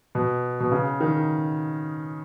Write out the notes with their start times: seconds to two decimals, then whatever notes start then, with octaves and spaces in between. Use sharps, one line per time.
0.15 B2
0.60 B2
0.72 C#3
1.00 D#3